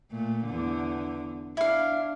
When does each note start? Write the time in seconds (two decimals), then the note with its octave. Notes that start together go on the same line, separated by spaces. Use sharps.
0.11 A#2 A3
0.46 E2 D3
1.57 D4 E4 F5